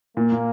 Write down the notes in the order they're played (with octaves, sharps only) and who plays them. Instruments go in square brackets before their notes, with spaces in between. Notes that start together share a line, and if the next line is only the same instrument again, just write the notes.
[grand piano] A#2 [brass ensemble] A#3
[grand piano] A#2